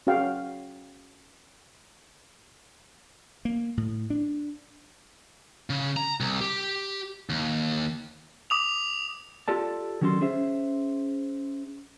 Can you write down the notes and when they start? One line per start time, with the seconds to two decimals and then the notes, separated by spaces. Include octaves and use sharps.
0.07 C#4 F#4 G#4 F5 G5
3.45 A#3
3.77 A2
4.10 D4
5.70 C#3
5.97 A#5
6.20 C2
6.41 G4
7.30 D#2
8.50 D6 D#6 F7
9.48 F4 G4 A4 D5 A5
10.01 D#3 F#3 C#4 F#4 A4 C6
10.21 C#4 G#4 C5 E5